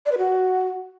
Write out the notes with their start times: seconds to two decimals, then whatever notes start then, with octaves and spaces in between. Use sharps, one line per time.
0.06 D5
0.12 B4
0.18 F#4